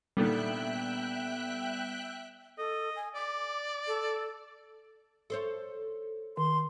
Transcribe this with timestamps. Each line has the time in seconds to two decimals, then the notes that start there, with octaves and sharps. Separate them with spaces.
0.17 A#2 D3 D#3 G3 B3 E5 G5 F#6
2.58 A4 D#5
2.96 G#5
3.15 D5 D6
3.88 A4
5.30 A4 C5 C#5
6.37 D#3 C6